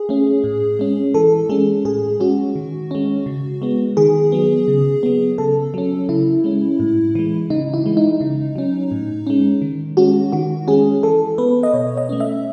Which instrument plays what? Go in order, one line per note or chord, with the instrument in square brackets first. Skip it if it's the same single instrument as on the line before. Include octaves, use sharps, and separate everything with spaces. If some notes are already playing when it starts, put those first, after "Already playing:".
Already playing: [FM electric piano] G#4
A3 C#4
A2
G#3 C#4
E3 A4
G#3 C#4 G#4
A2 G#4
G#3 C#4 F#4
D#3
G#3 C#4
C#3
G#3 B3
D#3 G#4
F#3 B3
C#3
F#3 B3
C#3 A4
F#3 C#4
C#3 E4
G#3 C#4
A2
E3 G#3
C#3 D#4
E4
E3 G#3
D#4
C#3
F#3 C#4
A2
G#3 C#4
D#3
G#3 C#4 F#4
D#3 F#4
G#3 C#4 G#4
E3 A4
B3 B4
D#5
B2 C#5
D#5
A3 C#4
E5